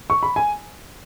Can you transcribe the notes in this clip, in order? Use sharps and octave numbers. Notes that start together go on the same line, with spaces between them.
C#6
B5
G#5